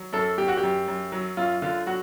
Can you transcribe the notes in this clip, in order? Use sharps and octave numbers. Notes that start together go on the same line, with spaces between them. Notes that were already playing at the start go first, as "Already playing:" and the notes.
Already playing: F#3
F#2 A4
F#2 G4
F#4
G4
F#2
F#2
F#3
F#2 F4
D3 F4
F#3 F#4